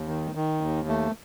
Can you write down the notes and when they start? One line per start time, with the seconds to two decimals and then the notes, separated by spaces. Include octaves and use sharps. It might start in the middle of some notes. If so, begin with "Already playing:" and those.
Already playing: D#2
0.08 D#3
0.35 D#3
0.61 D#2
0.88 A3